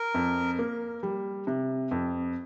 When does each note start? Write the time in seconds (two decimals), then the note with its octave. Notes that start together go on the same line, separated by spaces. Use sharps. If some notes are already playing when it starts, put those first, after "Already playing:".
Already playing: A#4
0.14 F2
0.59 A#3
1.03 G3
1.47 C3
1.91 F2